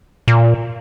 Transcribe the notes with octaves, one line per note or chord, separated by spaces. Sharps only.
A#2